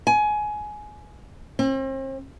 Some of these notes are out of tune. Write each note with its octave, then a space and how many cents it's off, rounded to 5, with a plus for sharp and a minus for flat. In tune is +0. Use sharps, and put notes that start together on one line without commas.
G#5 +20
C4 +40